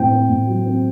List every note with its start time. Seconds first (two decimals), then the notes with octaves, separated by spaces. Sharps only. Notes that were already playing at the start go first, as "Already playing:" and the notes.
Already playing: A2 C4 G5
0.11 C4
0.29 A2
0.47 F#3
0.66 C4